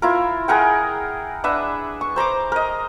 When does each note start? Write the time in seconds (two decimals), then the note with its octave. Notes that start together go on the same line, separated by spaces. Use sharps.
0.02 E4 F4 A#4
0.48 G#4 A#4 F#5 G5
1.44 D4 B4 E5 F#5
2.01 C#6
2.16 C5 A#5 C6 D6
2.52 A#4 D#5